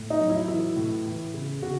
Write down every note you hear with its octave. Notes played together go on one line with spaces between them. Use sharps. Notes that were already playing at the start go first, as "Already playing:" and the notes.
Already playing: A2
D#4
F#3
E4
E3 E4
A2
E3
C#3
C#3 F#4